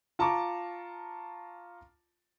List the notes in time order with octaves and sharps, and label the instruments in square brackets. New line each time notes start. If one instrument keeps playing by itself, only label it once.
[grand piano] F4 A5 A#5 C#6 D6